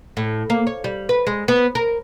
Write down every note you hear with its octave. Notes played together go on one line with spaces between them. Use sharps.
A2
A#3
C#5
G3
B4
G#3
B3
A#4